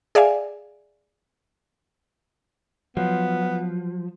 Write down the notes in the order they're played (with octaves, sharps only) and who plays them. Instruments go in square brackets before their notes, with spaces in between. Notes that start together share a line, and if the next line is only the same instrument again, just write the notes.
[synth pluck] G#4 D5 E5 F5 G#5
[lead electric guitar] F3 [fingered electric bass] F#3 [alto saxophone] B3